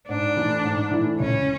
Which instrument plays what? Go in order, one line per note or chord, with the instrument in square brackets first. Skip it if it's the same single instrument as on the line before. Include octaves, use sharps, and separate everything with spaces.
[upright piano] G#2 [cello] D4
[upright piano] E3 A3 E4
G#2
E3 A3 E4
[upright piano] C#2 [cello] C#4